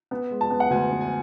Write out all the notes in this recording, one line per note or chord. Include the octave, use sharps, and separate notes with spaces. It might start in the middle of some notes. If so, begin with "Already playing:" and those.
B3
G#3
A5
B3
F#5
D2 G#5
B3
G#5